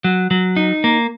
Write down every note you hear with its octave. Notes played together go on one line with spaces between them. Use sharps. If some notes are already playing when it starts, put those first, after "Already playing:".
F#3
F#3
D#4
A#3